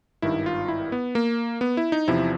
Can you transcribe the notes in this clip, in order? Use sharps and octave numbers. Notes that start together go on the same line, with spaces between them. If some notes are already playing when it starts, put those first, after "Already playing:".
G#1 G2 D#3 E4
F4
E4
B3
A#3
B3
E4
D#4
E2 C3 F3 E4